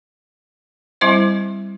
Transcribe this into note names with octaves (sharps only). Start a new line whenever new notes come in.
G3 C4 E4 C5 E5